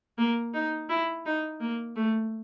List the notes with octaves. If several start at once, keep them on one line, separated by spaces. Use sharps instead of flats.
A#3
D#4
E4
D#4
A#3
A3